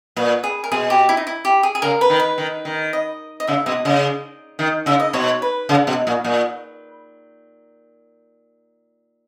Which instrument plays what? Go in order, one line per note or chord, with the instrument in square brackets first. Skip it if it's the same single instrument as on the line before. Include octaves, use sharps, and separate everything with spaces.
[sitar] A#2 [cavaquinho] B4
[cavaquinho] G#4
A#4
[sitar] B2 [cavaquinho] G#4
[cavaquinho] G4
E4
D#4
E4
G4
G#4
G#4
[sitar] C#3 [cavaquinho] A#4
[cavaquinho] B4
[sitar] D#3
[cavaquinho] B4
[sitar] D#3
D#3
[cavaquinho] D#5
D#5
[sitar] C#3 [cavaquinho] E5
[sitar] B2 [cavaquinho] D#5
[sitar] C#3 [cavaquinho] D#5
[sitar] D#3
[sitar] C#3 [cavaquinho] E5
[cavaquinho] D#5
[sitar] B2 [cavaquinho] C#5
[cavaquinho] B4
[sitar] C#3
B2
A#2
A#2